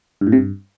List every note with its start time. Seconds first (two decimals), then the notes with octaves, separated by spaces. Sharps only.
0.21 G2
0.27 A2
0.32 C3
0.38 G2